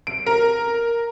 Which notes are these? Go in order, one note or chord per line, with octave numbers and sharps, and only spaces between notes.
D7
A#4